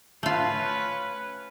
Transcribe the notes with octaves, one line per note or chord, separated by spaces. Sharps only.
A3 C#4 F4 B4